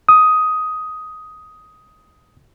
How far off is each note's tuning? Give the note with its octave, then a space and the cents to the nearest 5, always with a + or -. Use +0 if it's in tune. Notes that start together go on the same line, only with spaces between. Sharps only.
D#6 +10